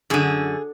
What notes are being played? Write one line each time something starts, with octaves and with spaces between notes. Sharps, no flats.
F#2 D3 G#4